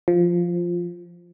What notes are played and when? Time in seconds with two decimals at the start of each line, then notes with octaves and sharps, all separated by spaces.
0.08 F3